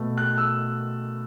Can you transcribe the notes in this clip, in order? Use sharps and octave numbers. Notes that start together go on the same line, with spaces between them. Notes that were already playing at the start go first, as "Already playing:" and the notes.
Already playing: B2 A3
F#6
E6